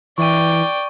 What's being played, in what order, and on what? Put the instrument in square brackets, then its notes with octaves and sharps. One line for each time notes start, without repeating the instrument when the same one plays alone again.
[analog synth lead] E3 [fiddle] D5 G5 [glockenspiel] C#6 D#7